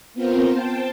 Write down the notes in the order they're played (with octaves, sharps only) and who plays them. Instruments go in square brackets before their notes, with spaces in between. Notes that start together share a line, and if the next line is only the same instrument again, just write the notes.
[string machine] B3 C4 F4 A#4 C5
C5 G5 A5